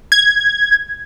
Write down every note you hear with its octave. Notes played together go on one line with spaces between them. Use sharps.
G#6